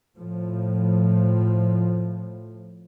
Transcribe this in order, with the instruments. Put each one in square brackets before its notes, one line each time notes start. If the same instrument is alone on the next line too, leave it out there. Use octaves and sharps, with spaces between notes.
[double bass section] A2 F3